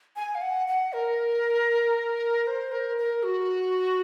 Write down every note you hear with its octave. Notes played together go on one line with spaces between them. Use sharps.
G#5
F5
F#5
F#5
A#4
C5
A#4
A#4
F#4